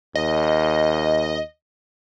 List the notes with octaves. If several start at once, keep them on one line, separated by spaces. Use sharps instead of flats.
D#2 D#5